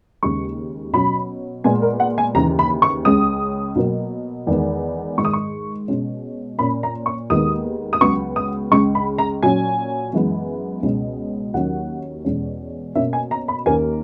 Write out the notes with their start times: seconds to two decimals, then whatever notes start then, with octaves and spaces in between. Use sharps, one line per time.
0.23 D#2 C#3 G#3 C#6
0.93 B2 F#3 C#4 B5
1.64 A#2 G#3 B3 G#5
1.82 A#4
2.00 F#5
2.18 G#5
2.35 D#2 C#3 E3 A#5
2.59 B5
2.82 C#6
3.05 C#2 C#3 G#3 C#4 D#6
3.76 B2 F#3 A#3
4.47 E2 D#3 G#3 B3
5.18 G#2 D#3 G#3 C#6
5.25 D#6
5.33 C#6
5.88 B2 G#3 C#4
6.59 A#2 A#3 C#4 B5
6.83 A#5
7.06 C#6
7.30 D#2 D#3 G#3 B3 D#6
7.93 D#6
8.01 C#2 C#3 F#3 B3 C#6
8.36 D#6
8.71 C#2 C#3 G#3 C#6
8.95 B5
9.18 A#5
9.43 A#2 F#3 C#4 G#5
10.13 F#2 E3 G#3 B3
10.83 C#2 B2 G#3 C#4
11.54 D#2 D#3 F#3 C#4 F#5
12.25 E2 B2 G#3 C#4
12.95 B2 A#3 C#4 E5
13.13 G#5
13.31 A#5
13.48 B5
13.66 D#2 D#3 A#3 C#4 G#5